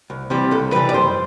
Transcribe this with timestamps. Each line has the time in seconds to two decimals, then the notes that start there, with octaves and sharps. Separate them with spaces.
0.10 C2
0.30 C3 E3 G3
0.51 C2 A4
0.72 C3 E3 G3 B4
0.89 D5
0.93 F#2 C5